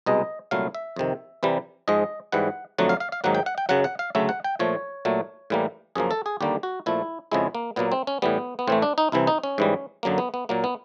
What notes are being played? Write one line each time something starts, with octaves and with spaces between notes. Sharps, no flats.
C2 B2 G#3 D#5
C2 A#2 F#3 A3 F5
E5
F2 C3 D#3
C2 C3 E3 G3
G#2 F3 G#3 D#5
G#2 E3 G3 F#5
F2 D3 F#3 A3 F#5
F5
F5
F5
G#2 D#3 F#3 A#3 F#5
G5
F#5
G5
F#2 C#3 F#3 F#5
F#5
F5
D2 C#3 F#3 A3 E5
F#5
G5
A#2 F3 A3 C#5
A#2 F#3 A3
A2 E3 G3 A#3
F#2 C#3 F3 A#3 G#4
A4
G#4
D#2 D3 G3 A#3 G4
F#4
A#2 F3 A3 E4
F2 C#3 F3 G#3 E4
A#3
A#2 F#3 A#3 B3
C4
C#4
A2 E3 G3 B3
B3
A2 E3 A3 C4
D4
D#4
C2 C3 E3 E4
D#4
C#4
G#2 E3 G3
F#2 D3 F#3 A#3
B3
B3
A#2 F#3 A#3
B3